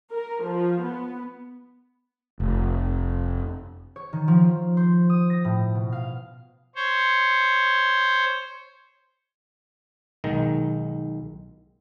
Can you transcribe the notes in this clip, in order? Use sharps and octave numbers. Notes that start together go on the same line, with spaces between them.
A#4
F3
B3
F1
C#5
D#3
F3
F4
C5
D#6
A#6
A2
B2
F5
C5 C#5
B1 D#3 G#3 A#5